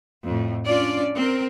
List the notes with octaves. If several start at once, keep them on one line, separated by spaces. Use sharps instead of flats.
F2 A2
C#4 D4 F4 D5
C4 A#4